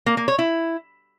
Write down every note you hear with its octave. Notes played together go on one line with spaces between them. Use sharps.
A#3
A#3
C#5
E4